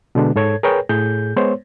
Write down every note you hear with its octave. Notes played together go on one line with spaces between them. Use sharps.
B2 D3 G#3 D4
G#2 A4 C#5 G#6
G#4 A#4 B4 C#5 G5
A2 G#4 G6
G#3 B3 C5 C#5